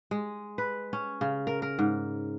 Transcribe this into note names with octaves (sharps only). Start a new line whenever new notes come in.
G#3
B4
C#4
C#3
A#4
A#4
G#2